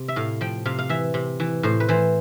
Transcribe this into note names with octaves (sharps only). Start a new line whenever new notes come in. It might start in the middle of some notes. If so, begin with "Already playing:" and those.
Already playing: C3
E5
A2 F5
F3 G5
C3 F5
F5
E3 E5
C3
E3
A2 C5
B4
E3 C5